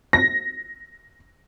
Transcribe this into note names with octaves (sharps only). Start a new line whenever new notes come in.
A#6